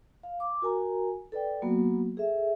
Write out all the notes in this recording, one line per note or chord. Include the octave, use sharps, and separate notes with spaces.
F5
D6
F#4 A#4 G#5 A#5
A4 B4 D5 G5
F#3 A#3 B3 F#4
G#4 A4 E5